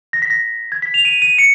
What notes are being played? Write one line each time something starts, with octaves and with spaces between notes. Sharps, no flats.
A#6
B6
A#6
G#6
B6
F7
D#7
D#7
C#7